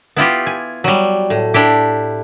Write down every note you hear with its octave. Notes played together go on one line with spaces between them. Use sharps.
B3 E4 F4 G4
G#5
F#3 G3
A2
D4 E4 G4